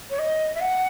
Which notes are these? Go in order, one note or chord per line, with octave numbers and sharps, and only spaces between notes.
C#5
D#5
E5
F#5